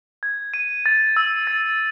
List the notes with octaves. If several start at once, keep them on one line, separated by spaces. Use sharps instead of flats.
G#6
D#7
A6
E6
A6